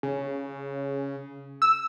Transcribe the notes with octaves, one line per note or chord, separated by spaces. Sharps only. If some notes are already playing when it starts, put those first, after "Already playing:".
C#3
E6